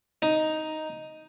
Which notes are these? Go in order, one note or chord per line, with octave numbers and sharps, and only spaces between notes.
D#4